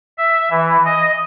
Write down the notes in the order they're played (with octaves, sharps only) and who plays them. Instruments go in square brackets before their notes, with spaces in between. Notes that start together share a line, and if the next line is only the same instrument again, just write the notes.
[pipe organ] E5
E3
D#5